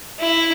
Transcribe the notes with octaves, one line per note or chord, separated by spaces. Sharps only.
E4